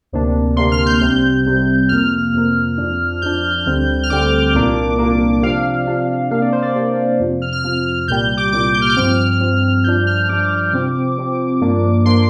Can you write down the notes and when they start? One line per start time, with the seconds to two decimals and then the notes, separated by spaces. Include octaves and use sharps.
0.12 D2 C3 A#3 D4
0.57 D2 C3 A#3 D4 C6
0.72 F6
0.86 G6
1.01 C2 C3 G3 C4 G6
1.45 C2 C3 G3 C4
1.89 F2 C3 A#3 F6
2.34 F2 C3 A#3
2.78 F2 F3 D4
3.22 F2 F3 D4 G6
3.66 D2 D3 G3 C4
4.03 F6
4.10 D2 D3 G3 C4 D6
4.54 C2 A#2 A#3 D4
4.99 C2 A#2 A#3 D4
5.43 C3 F3 D4 F5
5.87 C3 F3 D4
6.31 C3 A#3 D4 F5
6.42 D5
6.52 C5
6.62 D5
6.75 C3 A#3 D4 D5
7.20 F2 C3 F3
7.42 F6
7.53 F6
7.64 F2 C3 F3 F6
8.08 C2 A#2 G3 G6
8.37 D6
8.52 C2 A#2 G3 D6
8.74 G6
8.82 F6
8.90 D6
8.96 G2 F3 C4 F6
9.40 G2 F3 C4
9.84 G2 F3 D4 G6
10.07 F6
10.29 G2 F3 D4 D6
10.73 C3 F3 C4
11.17 C3 F3 C4
11.61 G2 F3 A#3 D4
12.05 F3 A#3 D4 C6